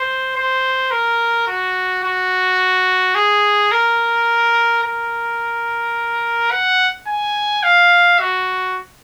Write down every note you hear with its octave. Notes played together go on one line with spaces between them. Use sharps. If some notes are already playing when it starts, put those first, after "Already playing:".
Already playing: C5
C5
A#4
F#4
F#4
G#4
A#4
A#4
F#5
G#5
F5
F#4